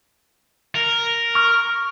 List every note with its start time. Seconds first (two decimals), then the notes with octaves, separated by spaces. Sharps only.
0.75 A#4
1.35 C#6 F6